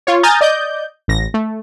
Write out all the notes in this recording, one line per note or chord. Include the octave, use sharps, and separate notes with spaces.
F4 C#5
G#5 A#5 D#6 F6 G6 A6
D5 D#5 G6
A1 A#6
A3